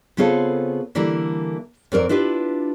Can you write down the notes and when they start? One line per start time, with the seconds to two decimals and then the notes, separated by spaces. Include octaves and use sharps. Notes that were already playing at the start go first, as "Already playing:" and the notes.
0.17 C#3 B3 C4 F4 G#4 A4
0.95 D3 E3 G3 A#3 E4
1.92 F2 C4 A#4 D5
2.09 D4 E4 F4 G4 B4